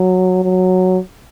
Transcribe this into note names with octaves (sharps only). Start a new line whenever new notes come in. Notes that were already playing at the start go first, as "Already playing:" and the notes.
Already playing: F#3
F#3